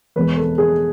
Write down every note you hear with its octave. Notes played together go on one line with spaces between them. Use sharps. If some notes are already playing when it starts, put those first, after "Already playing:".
E2 B2 G#3 B4
A4
G#4